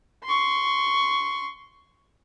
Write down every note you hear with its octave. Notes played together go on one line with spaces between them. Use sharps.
C6 C#6